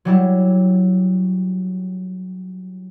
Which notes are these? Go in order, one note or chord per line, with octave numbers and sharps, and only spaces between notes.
F#3 G3 E4